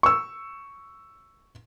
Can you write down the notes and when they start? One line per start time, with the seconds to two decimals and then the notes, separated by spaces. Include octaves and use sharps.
0.03 C#6 E6